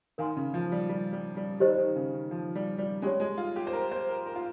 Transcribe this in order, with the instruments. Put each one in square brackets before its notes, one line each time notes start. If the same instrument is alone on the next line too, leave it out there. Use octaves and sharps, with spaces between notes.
[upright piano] D#3 [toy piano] A#4 F5 G#5 C6
[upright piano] C#3
F3
G3
G3
G3
G3
[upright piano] D#3 [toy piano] G4 C5 D#5
[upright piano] D#3
C#3
D#3
F3
G3
G3
[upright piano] G#3 [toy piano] C#4 G4 C#5
[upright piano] G#3
F4
G4
C5
A#4
C5
A#4
A#4
F4